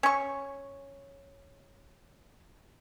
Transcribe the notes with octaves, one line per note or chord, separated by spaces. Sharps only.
C#4 C#6